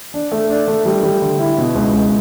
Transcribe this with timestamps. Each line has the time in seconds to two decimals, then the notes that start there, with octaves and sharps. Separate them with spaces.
0.14 D4
0.32 A3
0.50 D4
0.68 A3
0.85 G3
1.03 G3
1.22 D3
1.39 E4
1.58 B2
1.75 C#2
1.93 C#2